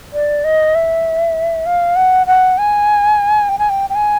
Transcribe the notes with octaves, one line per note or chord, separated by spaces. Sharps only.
D5
D#5
E5
F5
F#5
F#5
G#5
G5
G#5
G5
G5
G#5